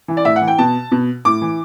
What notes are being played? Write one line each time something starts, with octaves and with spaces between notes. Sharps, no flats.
E3
D5
A2 E5
F#5
E3
G5
B2 A5
B2
A2 D6
E3